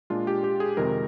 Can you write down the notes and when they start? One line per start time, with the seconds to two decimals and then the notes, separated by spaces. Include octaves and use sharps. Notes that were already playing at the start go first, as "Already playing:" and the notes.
0.10 A#2 G#3 D4 F4
0.27 G4
0.44 G4
0.60 G#4
0.77 F2 C3 D#3 G#3 C4 A#4